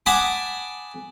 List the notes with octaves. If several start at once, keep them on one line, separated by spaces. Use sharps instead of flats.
F#5 G#5 A5 B5 D6 D#6